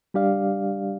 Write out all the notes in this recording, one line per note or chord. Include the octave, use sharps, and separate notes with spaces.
G3 D4 G4 D5 F5